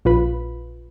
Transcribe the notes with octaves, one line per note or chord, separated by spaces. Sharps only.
A#1 F4 B4 B5